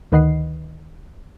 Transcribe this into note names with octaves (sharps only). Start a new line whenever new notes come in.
D2 D#3 B4 D#5 F#5 C7